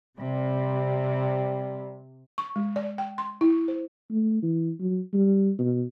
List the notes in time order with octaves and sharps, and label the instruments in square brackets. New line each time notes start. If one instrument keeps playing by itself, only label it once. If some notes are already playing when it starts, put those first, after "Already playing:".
[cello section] C3 [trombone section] G3
[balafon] C#6
G#3
D5
G5
C6
E4
C5
[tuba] A3
E3
F#3
G3
B2